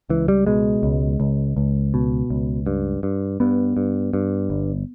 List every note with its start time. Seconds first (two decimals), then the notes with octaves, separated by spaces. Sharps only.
0.10 C#2 E3
0.28 G3
0.47 B2 G#3
0.83 C#2
1.20 C#2
1.57 C#2
1.94 B2
2.30 C#2
2.66 G2
3.03 G2
3.40 G2 B3
3.77 G2
4.13 G2
4.50 G1